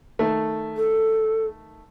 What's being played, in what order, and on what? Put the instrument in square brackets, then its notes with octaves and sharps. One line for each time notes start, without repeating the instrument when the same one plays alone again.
[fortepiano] D#3 A3
[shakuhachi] A4